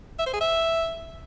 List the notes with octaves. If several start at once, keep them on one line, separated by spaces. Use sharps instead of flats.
E5
C5
G#4
E5